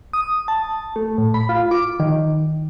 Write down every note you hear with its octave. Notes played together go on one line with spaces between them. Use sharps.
D#6
A5
A3
A2
B5
F4
D6
D#3